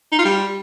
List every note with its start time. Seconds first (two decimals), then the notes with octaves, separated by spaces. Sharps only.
0.12 D#4
0.19 F4
0.25 G3